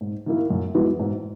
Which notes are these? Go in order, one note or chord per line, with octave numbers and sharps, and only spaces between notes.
G#2
D#3 A#3 E4
F#2
E3 G#3 B3 F#4
G#2